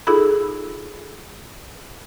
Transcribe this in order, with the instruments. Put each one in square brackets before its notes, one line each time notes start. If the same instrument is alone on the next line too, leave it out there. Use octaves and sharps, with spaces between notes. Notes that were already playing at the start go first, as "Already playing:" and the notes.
[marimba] D#4 F4 G#4 A4 B5